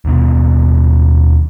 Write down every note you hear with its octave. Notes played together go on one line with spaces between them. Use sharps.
D#2 B2 B3